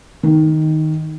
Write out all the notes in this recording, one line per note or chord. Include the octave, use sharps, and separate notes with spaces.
D#3